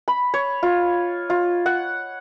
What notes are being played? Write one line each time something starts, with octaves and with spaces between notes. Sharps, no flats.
B5
C#5
F4
F4
F#5